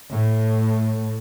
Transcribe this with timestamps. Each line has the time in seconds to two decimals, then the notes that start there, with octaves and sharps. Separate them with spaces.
0.11 A2